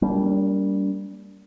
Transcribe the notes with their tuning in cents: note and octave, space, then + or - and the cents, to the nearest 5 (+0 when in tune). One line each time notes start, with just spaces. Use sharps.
G3 +0 A#3 +0 D4 -45